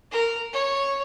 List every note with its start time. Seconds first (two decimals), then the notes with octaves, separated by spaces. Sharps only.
0.11 A#4
0.53 C#5